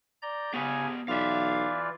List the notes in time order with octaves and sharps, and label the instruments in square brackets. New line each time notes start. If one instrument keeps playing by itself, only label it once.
[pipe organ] D5 A#5 G6
[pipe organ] C#3 C#5 G#5 [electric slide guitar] B3 G4
[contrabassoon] B1 [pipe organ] E3 F4 D5 [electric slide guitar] E5 F5